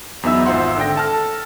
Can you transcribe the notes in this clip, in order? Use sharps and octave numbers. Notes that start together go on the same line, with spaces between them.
E2 F#3 B3 D#4 E5 E6
G#1 F4 C5 E5 F#5 C6
D3 D4 G5 A#6
A4 A5 F6